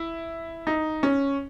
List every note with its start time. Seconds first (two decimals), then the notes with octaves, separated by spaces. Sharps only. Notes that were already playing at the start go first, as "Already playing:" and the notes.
Already playing: E4
0.67 D#4
1.03 C#4